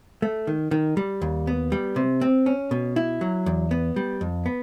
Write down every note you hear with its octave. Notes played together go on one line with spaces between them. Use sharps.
A3
D#3
D#3
G3
D#2
B3
G3
C3
C4
C#4
B2
E4
F#3
E2
B3
G3
F2
B3